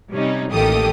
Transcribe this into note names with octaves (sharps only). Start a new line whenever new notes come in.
C3 G3 C#4 D#4
A1 D#3 A#3 G4 A4 D#6